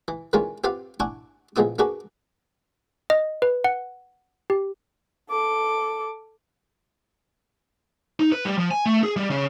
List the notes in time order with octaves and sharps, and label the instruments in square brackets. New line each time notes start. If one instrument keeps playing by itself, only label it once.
[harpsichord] E3
D#3 E3 G#3 A#3 C#4 F4
C4 F4 G4 B4 F5 F#5
D4 E4 F#5 G#5 C#6
A#1 F3 G#3 B3 E4 D#6
A#3 D4 F#4 G#4 B4
[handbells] D#5
B4
F#5
G4
[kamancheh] A4 D6
[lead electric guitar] D#4
B4
G3
F3
G#5
A3
G#4
G3
C#3